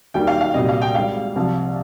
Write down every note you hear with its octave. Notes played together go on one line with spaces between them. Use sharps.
D#2 D#3 G3 G5
F5
F5
C2 A#2 G3 D#5
F5
G5
G#1 G#2 G3 F5
C2 C3 F3